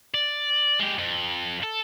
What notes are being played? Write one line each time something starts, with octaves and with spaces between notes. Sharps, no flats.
D5
G#3 G4
F2
A4